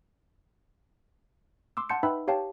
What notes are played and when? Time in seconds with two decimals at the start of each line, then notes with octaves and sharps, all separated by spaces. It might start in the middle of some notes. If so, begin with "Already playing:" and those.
1.77 C6 D6 E6
1.89 F#5 A5 C6 G6 C#7
2.03 D#4 B4 E5 G5 B5 E6
2.27 G4 C#5 F5 G5 A5